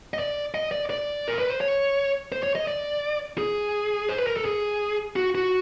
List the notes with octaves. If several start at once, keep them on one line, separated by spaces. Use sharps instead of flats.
D#5
D5
D#5
D5
D5
A#4
B4
C5
C#5
C5
C#5
D#5
D5
G#4
C5
B4
A#4
A4
G#4
F#4
F#4